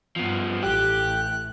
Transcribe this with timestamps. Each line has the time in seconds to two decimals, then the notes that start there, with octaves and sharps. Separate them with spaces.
0.16 G2 F3 B3
0.63 A1 A3 G4 F#6